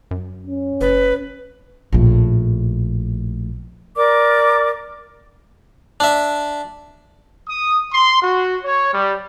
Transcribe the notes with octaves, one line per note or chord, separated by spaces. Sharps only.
F#2
C#4
F#1 B4
A#1 A2
A#4 D5 D6
D4 E5
D#6
C6
F#4
C#5
G3